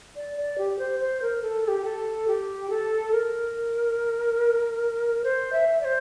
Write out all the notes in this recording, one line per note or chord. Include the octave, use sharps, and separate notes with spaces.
D5
D5
G4
C5
C5
A#4
A4
A4
G4
A4
G4
A4
A#4
C5
E5
D5
C5